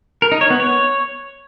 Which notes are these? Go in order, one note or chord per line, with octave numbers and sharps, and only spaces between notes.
A#4
D#4
C#5
B3
C#5